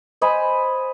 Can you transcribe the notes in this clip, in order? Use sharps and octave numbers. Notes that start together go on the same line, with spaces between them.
C5 D#5 G#5 B5